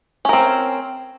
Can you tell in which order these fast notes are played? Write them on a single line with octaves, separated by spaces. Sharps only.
C#4 A#4 C4